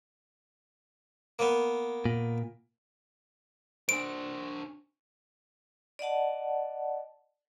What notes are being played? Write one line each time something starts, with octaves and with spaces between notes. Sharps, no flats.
A#3 B3
A#2
D4 C5 D7
D5 D#5 F#5 A5